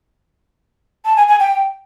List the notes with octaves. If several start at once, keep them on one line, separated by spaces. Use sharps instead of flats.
A5
G#5
G#5
G5